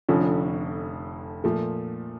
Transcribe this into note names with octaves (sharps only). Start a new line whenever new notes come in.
F1 F2 D3 F3 C#4
A#2 F3 A3